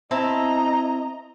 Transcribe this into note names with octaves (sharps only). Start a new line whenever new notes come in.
C4 E4 D#5 A5 A#5